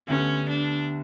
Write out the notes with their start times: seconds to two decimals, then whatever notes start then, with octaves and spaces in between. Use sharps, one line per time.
0.08 D2 D3 G3 B3 C#4
0.48 D4